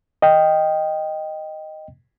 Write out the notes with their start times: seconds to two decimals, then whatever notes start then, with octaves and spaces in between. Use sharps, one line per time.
0.22 D#5 G5